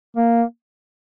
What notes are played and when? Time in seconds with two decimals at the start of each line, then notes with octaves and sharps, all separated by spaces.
0.16 A#3